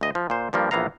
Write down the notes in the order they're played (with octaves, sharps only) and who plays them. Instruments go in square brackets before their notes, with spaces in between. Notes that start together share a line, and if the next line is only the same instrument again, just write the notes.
[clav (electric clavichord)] D2 D#5
F3
A#2 C5
G2 F3 G3 A#3
A#1 E3 B3 F5 A#5